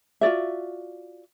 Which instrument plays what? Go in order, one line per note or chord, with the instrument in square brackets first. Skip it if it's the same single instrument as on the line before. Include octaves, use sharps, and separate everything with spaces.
[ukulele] F4 F#4 D5 E5